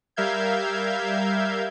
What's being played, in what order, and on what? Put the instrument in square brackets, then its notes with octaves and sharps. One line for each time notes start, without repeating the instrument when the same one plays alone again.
[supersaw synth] G3 A#4 E5 F5 G6 G#6